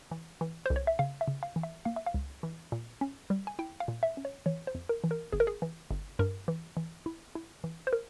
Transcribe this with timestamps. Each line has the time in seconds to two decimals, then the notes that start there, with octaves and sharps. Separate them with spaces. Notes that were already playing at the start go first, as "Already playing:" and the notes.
0.11 E3
0.41 E3
0.66 C2 C5
0.76 C#5
0.87 E5
0.99 C#3 F5
1.21 E5
1.28 C#3
1.43 F5
1.56 E3
1.63 E5
1.85 A#3 F5
1.96 E5
2.06 F5
2.14 C#2
2.43 E3
2.72 A#2
3.01 C#4
3.30 G3
3.47 G#5
3.59 E4 G5
3.80 F5
3.88 A#2
4.03 E5
4.17 C#4
4.25 C#5
4.46 E3 C#5
4.67 C5
4.75 F2
4.89 A#4
5.04 E3
5.11 A#4
5.32 G1 G#4
5.40 A#4
5.47 G#4
5.62 E3
5.91 G1
6.19 G2 A#4
6.48 E3
6.77 E3
7.06 E4
7.35 E4
7.64 E3
7.87 C5
7.93 A#4